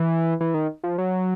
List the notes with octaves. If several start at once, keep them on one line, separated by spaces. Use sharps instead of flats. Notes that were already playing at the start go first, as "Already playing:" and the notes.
Already playing: E3
E3
D#3
F3
F#3